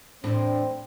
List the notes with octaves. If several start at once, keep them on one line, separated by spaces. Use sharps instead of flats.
E2 A2 C4 D4